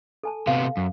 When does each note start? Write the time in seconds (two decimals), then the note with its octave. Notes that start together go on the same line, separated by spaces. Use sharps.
0.24 A4 G#5 A5
0.47 C3 B3 F5
0.77 F#2